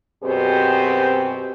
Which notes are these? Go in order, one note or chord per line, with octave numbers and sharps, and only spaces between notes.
F#2 B2 C4 G4 G#4 C5